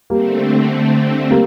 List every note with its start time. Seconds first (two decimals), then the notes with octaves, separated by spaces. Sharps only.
0.10 D3 G3 A3 A#3 C4
1.30 G3 A#3